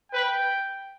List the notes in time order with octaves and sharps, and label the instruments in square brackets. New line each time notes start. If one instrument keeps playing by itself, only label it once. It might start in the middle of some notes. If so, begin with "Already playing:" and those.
[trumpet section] B4 [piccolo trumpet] G5